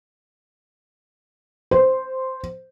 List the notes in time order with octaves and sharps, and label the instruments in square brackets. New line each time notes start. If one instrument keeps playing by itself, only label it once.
[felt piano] C5